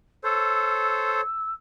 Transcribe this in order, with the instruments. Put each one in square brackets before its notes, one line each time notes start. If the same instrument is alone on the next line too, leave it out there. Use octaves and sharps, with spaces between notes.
[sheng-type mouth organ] A4 C5 C#5 [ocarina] E6